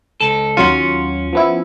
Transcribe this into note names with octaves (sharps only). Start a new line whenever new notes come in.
C#2 A4
D#2 F#3 C#4 F4
F3 B3 E4